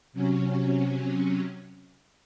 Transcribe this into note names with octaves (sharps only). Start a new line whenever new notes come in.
C3 F#3 C#4